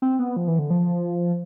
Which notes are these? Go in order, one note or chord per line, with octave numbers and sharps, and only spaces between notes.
C4
B3
F3
E3
D3
F3